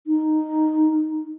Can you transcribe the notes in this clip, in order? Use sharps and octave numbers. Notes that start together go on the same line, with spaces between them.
D#4